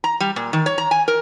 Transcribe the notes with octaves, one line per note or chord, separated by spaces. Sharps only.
A#5
G3
A#2
D#3
C#5
A#5
G#5
A#4